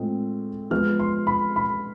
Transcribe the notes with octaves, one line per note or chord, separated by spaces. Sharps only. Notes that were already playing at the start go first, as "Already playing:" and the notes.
Already playing: A2 G#3 C4 F4
F3 G#3 B3 F4 F6
C6
B5
B5